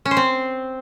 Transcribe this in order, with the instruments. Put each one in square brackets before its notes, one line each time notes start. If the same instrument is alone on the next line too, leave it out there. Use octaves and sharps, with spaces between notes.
[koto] C#4
C5
C4